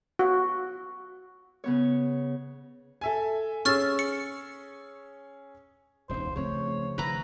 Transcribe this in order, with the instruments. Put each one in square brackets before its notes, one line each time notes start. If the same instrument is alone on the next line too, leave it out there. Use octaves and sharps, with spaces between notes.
[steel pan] F#4
[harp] C#3 B3 C#5
[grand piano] A4 E5 G#5
[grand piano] C#4 G#4 E6 [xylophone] C#6 F6 A6
[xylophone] C#7
[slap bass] E1 [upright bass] C#2 D#4 [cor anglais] C5
[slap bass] C#3 F3 [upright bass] A3 C4 [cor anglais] C#5
[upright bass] D#3 [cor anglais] E4 [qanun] B4 A#5